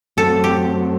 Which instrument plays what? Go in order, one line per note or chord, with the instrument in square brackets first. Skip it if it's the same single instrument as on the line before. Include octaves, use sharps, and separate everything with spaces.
[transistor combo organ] F#2 F#3 A3 C4 [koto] A4
[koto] G4